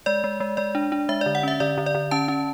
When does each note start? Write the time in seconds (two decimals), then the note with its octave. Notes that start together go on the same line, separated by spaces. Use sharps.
0.06 G#3 D5
0.24 G#3
0.40 G#3
0.57 G#3 D5
0.75 D4
0.92 D4
1.09 G#3 E5
1.21 D5
1.26 D3
1.35 F#5
1.43 C#4 E5
1.60 D3 D5
1.78 D3
1.86 D5
1.95 D3
2.11 C#4 A5
2.28 C#4